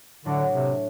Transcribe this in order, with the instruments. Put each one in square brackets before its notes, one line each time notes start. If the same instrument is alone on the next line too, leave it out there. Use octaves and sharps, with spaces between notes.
[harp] A2 F#3 A3 D4 F#4 [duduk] D3
[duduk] C3